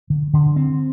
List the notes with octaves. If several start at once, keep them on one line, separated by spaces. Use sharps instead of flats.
D3
D3
C4